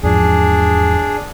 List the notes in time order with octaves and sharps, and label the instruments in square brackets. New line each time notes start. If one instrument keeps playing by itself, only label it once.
[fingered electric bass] E2 G#2 F3 [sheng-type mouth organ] D4 G#4